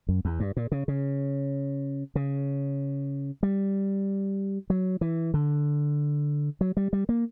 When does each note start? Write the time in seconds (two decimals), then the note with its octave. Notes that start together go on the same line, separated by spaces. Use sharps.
0.09 F#2
0.25 E2
0.40 G2
0.57 A#2
0.72 C#3
0.88 C#3
2.15 C#3
3.43 G3
4.70 F#3
5.01 E3
5.34 D3
6.61 F#3
6.77 G3
6.93 G3
7.09 A#3